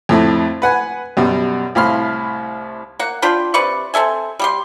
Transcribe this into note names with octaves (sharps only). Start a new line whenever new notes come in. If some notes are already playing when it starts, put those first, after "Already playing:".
F2 A2 A3 E4
B4 F#5 G#5
F#2 B2 G3
C2 A2 F5 B5 C6 F6
A#3 F#5
D4 F4 G5 B5
C3 B4 D5 C#6
C4 A4 E5 G#5
G3 G4 C6